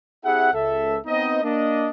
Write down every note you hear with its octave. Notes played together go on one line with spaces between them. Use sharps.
C4 E4 G4 G#4 E5 F#5
C#2 A4 E5
B3 C4 D#4 D#5
A#3 D4 D#5